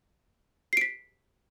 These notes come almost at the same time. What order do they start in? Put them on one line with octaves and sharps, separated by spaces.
C7 D7 B6